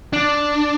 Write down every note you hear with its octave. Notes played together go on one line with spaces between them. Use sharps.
D4